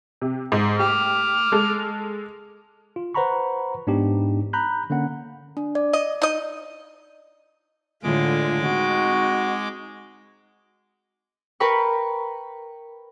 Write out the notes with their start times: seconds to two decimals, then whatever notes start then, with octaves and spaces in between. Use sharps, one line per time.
0.22 C3
0.52 G#2
0.79 G4 D6 F6
1.52 G#3 A4
2.96 F4
3.15 B4 C5 F#5 A#5 B5 C#6
3.87 G#2 B3 D4 D#4 G4
4.53 A#5 B5 F#6 G6
4.90 D3 A#3 C#4 F#5
5.57 D4
5.75 D5
5.93 D#5
6.22 D#4 D#5
8.03 A2 D3 G#3 F4 D6
8.64 C4 D#4 F#4
11.60 A#4 B4 G5 B5 C#6